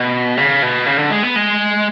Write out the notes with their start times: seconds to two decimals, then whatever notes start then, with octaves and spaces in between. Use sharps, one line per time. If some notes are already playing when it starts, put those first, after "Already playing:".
Already playing: B2
0.37 C#3
0.63 B2
0.86 C#3
0.98 D3
1.11 G#3
1.23 B3
1.36 G#3